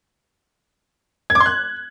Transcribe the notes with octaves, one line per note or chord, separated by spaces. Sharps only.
G#6
D6
C6
F#6